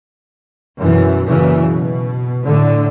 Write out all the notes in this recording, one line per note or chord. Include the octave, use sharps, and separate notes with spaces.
F#2 B2 E3
F#2 A#2 C#3 E3
B2
A2 D3